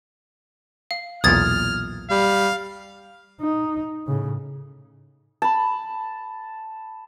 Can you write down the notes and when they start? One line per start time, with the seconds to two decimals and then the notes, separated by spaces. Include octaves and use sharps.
0.91 F5
1.24 B1 E2 A#2 D#6 F6 G#6 A6
2.11 G3 F5
3.41 D#4
4.07 A2 C#3
5.42 A5 B5